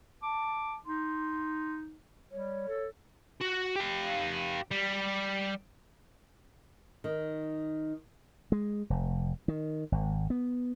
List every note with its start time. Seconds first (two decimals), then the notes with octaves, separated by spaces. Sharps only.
0.23 A5 D6
0.86 D#4 C6
2.32 G3 C#5
2.68 A4
3.41 F#4
3.76 G4 F5
4.71 G3
7.04 D#3
8.52 G#3
8.90 F1
9.48 D#3
9.92 G#1
10.30 B3